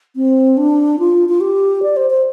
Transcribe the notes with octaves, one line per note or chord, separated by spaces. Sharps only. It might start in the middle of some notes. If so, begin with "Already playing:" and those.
C4
D4
F4
F4
G4
D5
C5
C5